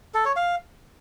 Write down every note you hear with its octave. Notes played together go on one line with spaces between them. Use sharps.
A4
C#5
F5